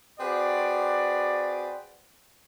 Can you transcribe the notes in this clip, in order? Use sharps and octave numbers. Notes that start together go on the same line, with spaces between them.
C4 F#4 G#4 B4 D5